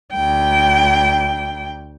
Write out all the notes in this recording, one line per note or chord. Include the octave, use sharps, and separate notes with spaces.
D2 G5